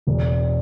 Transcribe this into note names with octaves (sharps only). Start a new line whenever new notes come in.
E1